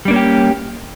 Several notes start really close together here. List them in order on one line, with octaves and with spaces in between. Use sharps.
G3 D4 A#3 C#4 G4